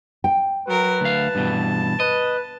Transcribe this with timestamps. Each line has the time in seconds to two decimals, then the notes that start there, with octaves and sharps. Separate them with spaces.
0.24 G5
0.67 F#3 A#4 B4
1.01 D2 F5 A5
1.35 G2 B2 E3
2.00 B4 D#5